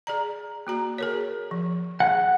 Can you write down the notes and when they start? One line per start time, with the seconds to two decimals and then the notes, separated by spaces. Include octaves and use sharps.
0.07 G#4 D5 A#5
0.67 A#3 F#4 A#5
0.98 G#4 A#4 C#5
1.51 F3
2.00 G#4 F#5